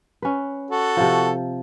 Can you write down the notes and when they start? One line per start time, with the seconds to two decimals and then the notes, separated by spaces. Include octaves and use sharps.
0.22 C#4 B4
0.71 F#4 A4
0.97 C3 F3